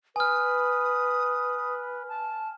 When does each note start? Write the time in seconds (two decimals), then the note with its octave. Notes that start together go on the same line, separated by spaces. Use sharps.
0.16 B4 G#5 D#6 F6
2.09 A5